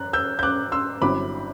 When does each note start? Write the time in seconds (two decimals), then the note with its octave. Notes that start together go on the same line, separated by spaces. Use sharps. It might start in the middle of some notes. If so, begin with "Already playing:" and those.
Already playing: F#2 F#6
0.13 E6 G6
0.39 G6
0.43 D6 F#6
0.72 C6 E6
1.02 G1 G2 F#3 C4 E4 B5 D6